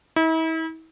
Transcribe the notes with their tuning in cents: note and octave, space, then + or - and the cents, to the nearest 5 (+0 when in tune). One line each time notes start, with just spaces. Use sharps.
E4 -40